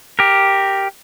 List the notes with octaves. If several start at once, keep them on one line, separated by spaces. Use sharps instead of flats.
G4 A#4